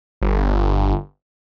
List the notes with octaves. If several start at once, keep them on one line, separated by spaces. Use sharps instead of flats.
G1